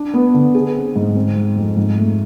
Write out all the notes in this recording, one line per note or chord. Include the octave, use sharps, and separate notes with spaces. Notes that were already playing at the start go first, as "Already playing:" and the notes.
Already playing: D4
B3
D3
G#4
C4
G#2
C4
G#3
F2
G#2
A3